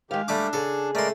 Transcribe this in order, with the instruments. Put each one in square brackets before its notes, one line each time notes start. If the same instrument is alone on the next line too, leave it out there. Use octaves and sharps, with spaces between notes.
[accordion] D#3 G4 [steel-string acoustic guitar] G#3 F5
[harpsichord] G3 A3 D6 [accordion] D4
[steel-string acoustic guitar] C#3 G#4 [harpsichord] A4
[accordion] G#3 A#4 D5 [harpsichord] A3 C6